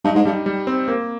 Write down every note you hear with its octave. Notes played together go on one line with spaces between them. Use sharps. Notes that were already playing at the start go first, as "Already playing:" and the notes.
G2 D#4
G#2
G2 G3
G3
C4
A#3